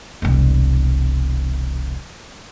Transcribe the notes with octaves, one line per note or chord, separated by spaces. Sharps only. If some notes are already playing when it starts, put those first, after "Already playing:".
E1 C2